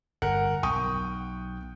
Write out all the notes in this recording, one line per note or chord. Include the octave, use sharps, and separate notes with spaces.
G1 A#4 F#5
B1 G5 C#6 D#6